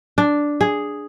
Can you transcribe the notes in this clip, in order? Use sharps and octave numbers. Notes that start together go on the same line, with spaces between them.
D4
G#4